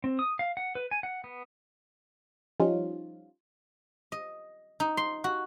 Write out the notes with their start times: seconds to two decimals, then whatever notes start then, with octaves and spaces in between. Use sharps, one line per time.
0.04 C4
0.19 D#6
0.39 F5
0.57 F#5
0.75 B4
0.91 G#5
1.03 F#5
1.24 B3
2.60 F3 G3 C#4 D#4 F4
4.12 D#5
4.80 D#4
4.97 C6
5.24 F#4